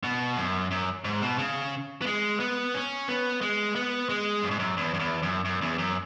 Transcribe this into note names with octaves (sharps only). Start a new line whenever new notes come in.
B2
F#2
F#2
G#2
B2
C#3
B3
G#3
B3
C#4
B3
G#3
B3
G#3
F#2
G#2
F#2
E2
F#2
E2
F#2
F#2
E2
F#2